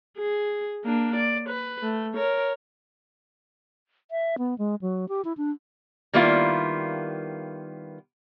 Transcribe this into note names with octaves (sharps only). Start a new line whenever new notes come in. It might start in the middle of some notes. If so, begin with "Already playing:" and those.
G#4
A#3 D4
D5
B4
A3
A#4 C#5
E5
B3
G#3
F#3
G4
E4
D4
D#3 G3 A#3 B3 E4 F4